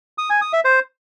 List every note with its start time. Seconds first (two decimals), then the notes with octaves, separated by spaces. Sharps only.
0.18 D#6
0.30 G#5
0.41 D#6
0.53 E5
0.65 C5